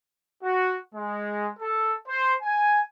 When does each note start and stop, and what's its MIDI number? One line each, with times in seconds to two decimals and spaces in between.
0.42 0.77 66
0.93 1.48 56
1.60 1.94 69
2.07 2.33 72
2.42 2.80 80